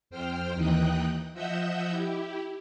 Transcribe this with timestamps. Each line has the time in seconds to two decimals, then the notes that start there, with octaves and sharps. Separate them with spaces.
0.10 F2 C5 G5 F6
0.54 D#2 E3 D#4 G5 D#6 F#6
1.33 F3 D#5 E5 F#5 E6 G6
1.90 E4 G4